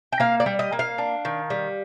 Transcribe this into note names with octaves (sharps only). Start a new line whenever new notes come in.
G5
A#3 F5
D5
G3
D#5
A#3
F5
D4
D#3
G3